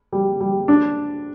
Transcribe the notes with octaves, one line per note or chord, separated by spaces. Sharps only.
G3
G3
D4